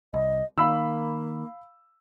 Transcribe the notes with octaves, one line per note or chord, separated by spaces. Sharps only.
C2 D#5
D#3 A#3 F5 B5 E6